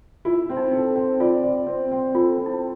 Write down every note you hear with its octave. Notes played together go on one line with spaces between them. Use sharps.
E4 F4
C4
D#4
A4
C4
F4 D5
D5
C4
C4
F4 A4
C4
E4